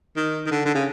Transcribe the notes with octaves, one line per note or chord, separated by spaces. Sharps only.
D#3
D#3
D3
D3
C#3